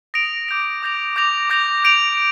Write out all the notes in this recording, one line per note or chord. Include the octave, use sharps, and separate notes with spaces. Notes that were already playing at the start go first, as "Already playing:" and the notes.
D#6 A#6 D7 F7
D6 G6 A#6 F7
D6 G6 A#6 F7
D6 G6 A#6 F7
D6 G6 A#6 F7
G6 D7 F7